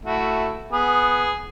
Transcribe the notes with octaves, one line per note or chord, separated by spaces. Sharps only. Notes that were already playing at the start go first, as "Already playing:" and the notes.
A3 E4 F#4
B3 G#4